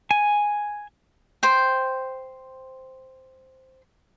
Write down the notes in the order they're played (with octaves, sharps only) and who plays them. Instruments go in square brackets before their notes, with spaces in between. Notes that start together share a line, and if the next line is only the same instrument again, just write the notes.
[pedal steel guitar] G#5
[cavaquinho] C5 G5